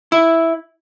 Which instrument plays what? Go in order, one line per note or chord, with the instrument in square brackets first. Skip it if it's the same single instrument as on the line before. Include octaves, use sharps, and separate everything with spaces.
[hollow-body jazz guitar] E4